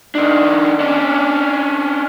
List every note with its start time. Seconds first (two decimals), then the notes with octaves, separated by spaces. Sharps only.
0.15 D#3 D4
0.80 C#4 D4